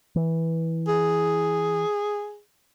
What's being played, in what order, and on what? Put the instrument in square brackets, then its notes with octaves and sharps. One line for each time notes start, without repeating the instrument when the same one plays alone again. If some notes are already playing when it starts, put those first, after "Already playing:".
[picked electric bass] E3
[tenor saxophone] G#4